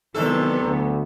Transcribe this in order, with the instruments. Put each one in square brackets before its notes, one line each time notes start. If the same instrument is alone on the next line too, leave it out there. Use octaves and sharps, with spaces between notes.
[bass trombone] G#1 [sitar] E2 C3 A4 [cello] F#3 B3
[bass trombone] D2